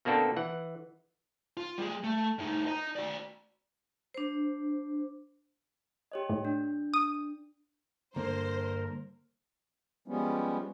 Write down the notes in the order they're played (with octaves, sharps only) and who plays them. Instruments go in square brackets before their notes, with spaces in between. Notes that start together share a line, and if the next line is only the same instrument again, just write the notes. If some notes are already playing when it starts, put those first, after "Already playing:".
[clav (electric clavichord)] B2 A#3 C4 D4 F#4 A4
E3 F#5
[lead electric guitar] F4
G3 G#4
A3
A2 D#4
D#5 A#5
F#4 D5
[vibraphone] D4 C5
[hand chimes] G4 C#5 D#5
[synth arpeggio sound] A2
[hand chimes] D4
[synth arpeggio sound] D#6
[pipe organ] G2 A#4 [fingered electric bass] D3 A#3 [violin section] C5
[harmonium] F3 G3 G#3 B3 C#4